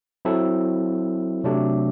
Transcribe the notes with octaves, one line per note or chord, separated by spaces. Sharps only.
F#3 C4 E4 A4
C3 F#3 A3 D4 G4